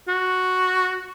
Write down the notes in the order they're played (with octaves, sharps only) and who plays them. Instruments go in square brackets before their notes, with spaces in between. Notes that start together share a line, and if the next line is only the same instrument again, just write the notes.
[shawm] F#4